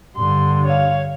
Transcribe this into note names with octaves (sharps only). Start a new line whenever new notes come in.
G2 D3 C6
C#5 F5